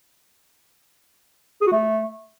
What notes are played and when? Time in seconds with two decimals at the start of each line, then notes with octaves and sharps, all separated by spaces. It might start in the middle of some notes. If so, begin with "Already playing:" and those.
1.61 G#4
1.67 F#4
1.72 A3